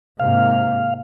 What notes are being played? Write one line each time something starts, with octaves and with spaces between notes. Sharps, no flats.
G#2 C3 A#3 F5